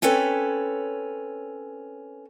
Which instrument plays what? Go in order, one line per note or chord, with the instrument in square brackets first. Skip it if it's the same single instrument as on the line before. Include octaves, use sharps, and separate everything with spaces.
[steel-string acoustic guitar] C4 C#4 A4 B4 C#5